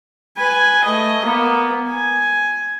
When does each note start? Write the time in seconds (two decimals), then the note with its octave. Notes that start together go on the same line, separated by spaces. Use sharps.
0.37 B4 G#5
0.85 A3 D#5
1.24 A#3 B3
1.89 G#5